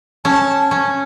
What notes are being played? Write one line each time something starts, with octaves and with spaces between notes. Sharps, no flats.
C#4 A5
C#4